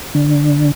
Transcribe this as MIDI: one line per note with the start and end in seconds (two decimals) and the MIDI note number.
0.15 0.71 50